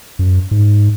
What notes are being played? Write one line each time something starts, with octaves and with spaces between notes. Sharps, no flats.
F#2
G#2